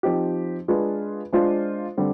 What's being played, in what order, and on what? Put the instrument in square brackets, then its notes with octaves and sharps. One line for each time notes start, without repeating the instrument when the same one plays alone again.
[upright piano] F3 C4 D#4 G4
G#3 D4 F4 G#4 B4
G#3 D4 F4 C5
D3 G3 C4